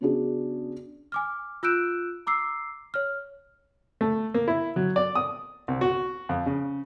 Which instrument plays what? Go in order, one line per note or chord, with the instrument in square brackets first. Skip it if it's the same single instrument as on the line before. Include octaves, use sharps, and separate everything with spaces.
[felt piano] C#3 B3 C#4 D4 F#4 G#4
[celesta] G#5 D6 F6
F4 E6 F#6 G6 D7 E7
A#5 D6 E6 C7
C#5 F6
[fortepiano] A3
A#3
E4
F#3
D5
D#6
C2
F#4
F2
C#3